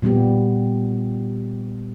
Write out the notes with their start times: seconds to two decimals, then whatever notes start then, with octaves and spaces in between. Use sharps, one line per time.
0.02 A#2 G3 B3 G4